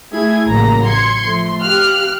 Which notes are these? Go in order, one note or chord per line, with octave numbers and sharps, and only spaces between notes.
A3 E4 G#4 G#6
A1 C#3 F#3 A#3 A#5 A#6
C6 G#6 C#7
F3 A3 C6
G4 F5 F6 F#6